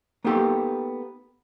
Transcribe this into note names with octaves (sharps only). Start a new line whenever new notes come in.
A#3 B3 D#4 G4 A4